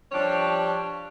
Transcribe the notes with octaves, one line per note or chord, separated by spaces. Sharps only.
F3 G3 D4 G4 C#5